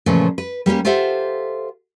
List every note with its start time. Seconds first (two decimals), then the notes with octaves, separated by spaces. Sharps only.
0.06 A#2 C#3 E3 F3 A3
0.38 B4
0.66 G3 A#3 C#4 G4
0.85 F4 G4 A4 C5 E5 F#5